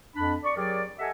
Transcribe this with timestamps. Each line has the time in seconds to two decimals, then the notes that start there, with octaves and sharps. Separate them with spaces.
0.16 F2 D4 B5
0.43 D5 C#6
0.57 F#3 G4 G#4 A#4 D5
0.98 G4 A4 D#5 E5 F#5 G#5